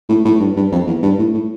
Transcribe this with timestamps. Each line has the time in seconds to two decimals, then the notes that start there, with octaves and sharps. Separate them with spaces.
0.09 A2
0.25 A2
0.39 G2
0.56 G2
0.72 F2
0.87 E2
1.02 G2
1.18 A2
1.33 A2